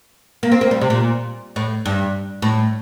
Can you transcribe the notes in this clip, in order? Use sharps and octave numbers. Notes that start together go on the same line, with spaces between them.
A#3
C4
A#3
G3
C3
A#2
A2
G2
A2